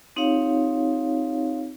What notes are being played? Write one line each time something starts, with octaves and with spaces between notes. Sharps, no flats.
C4 D#4 F4 G4 C#5 F5